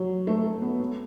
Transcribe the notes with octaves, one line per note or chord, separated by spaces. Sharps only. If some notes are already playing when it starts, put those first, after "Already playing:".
Already playing: F#3
A3
A3
B3
B3